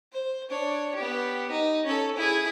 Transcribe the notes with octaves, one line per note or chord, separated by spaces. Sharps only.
C5
D4 C#5
B3 G4
D#4
C#4 A4
E4 G#4